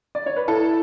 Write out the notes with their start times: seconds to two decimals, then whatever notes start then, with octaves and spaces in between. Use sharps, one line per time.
0.15 D5
0.26 C#5
0.36 B4
0.48 E4 A4